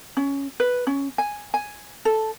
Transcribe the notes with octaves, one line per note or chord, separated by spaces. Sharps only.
C#4
B4
C#4
G#5
G#5
A4